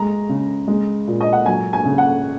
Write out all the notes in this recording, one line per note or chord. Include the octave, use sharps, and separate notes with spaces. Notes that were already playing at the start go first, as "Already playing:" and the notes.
Already playing: G#3 A#5
C#3
G#3
A#2
D#5
F#5
F#3 G#5
G#5
C#3
F#5